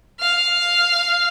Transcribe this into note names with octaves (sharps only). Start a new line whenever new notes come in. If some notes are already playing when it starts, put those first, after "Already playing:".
F5